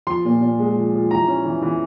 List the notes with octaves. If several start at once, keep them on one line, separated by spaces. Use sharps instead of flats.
F3 C6
A#2
A#2
G#3
F3
F3
E3 A#5
C#4
E3
E3